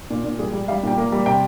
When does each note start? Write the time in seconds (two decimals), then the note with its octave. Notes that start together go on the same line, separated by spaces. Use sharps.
0.10 A#2
0.24 A#2
0.39 G3 G#4
0.53 G3
0.68 G3 F5
0.83 A#2 G5
0.97 A#3
1.12 G3
1.26 C3 G5